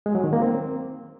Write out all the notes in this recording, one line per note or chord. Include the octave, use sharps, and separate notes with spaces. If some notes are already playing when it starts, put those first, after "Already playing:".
G#3
F#3
D#3
A#3
C4